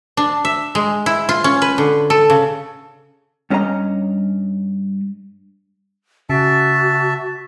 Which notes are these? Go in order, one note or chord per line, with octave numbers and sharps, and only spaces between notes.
D4
E5
G#3
E4
F4
C#4
B4
D3
A4
C#3
G2 C#4 F#4 A#4 D#5 A#5
C#3 F#4 E5 A5